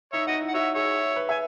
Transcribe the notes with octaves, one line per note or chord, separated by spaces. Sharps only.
D#4 C#5 E5
D#4 D#5 F#5
E4
F#5
F#4 C#5 E5
G#4 C#5 E5
B4
E5 G#5